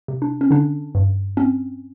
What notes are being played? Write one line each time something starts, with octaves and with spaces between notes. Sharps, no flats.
C3
D4
C#4
D3 D4
G2
C4 C#4